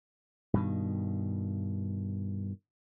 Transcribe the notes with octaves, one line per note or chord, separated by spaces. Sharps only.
G2 B2 D#3